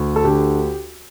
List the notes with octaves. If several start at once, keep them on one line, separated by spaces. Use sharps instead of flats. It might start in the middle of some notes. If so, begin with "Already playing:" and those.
Already playing: D2
A4
D3 G4